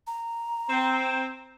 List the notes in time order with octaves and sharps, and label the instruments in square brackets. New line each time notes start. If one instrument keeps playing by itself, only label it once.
[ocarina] A#5
[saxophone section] C4